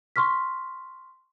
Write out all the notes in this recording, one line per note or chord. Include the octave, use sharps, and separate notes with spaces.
C6 C#6 F6 B6